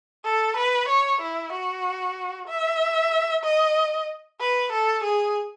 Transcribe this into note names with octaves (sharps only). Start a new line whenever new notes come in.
A4
B4
C#5
E4
F#4
E5
D#5
B4
A4
G#4